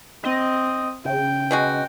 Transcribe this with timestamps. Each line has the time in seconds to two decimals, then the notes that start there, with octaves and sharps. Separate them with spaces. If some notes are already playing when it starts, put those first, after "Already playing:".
0.24 C4 D#5
1.05 C#3 G5
1.51 B2 G#3 F#4